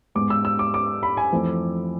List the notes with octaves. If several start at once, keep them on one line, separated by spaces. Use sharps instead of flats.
G#2 G#3 B3 D6
E6
E6
D6
D6
B5
G#5
F2 E3 A3 C4